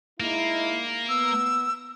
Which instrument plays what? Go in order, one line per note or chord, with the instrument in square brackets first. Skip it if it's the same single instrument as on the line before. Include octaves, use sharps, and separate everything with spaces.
[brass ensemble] G#3 D#4 E4 [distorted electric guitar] A#3
[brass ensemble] B3 [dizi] E6